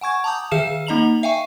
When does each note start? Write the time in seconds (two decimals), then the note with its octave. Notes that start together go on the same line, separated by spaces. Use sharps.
0.01 F#5 G#5 C#6 G#6
0.24 A5 A#5 D6 D#6 G6
0.51 D#3 G#4 E5 F5 F6 E7
0.87 A#3 D#4 D#5 A#5 F7 F#7
1.23 E5 F5 G5 G#5 C#6